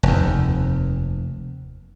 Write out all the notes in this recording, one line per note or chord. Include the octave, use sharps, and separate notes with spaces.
F1 D#2